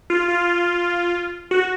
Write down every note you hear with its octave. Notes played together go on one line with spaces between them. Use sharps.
F4
F4
F#4